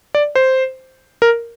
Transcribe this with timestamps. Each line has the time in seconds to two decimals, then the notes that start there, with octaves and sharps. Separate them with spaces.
0.15 D5
0.35 C5
1.22 A#4